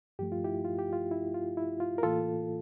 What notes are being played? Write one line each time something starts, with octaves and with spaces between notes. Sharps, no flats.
G2 F3 A3 G4
F4
E4 G4
F4
G4
F4
E4
F4
E4
F4
A#4
A2 E3 A#3 F4 A4